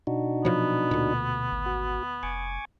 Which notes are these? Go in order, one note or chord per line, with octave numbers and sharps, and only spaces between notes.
B2 D4 D#4 F#4
A#2 F3 F#3 B3
D2 A#2
G#1
F#4
F1 G#5 C#6 D6